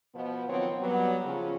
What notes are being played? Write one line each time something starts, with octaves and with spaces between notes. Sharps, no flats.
B2 F3 B3
D#3 F3 F#3 B3 C4 C#5
F#3 G3 B3
C#3 F3 C#4